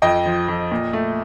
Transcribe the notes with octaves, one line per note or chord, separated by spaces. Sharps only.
F2 D#5 G5
F3
F2
A#2
A3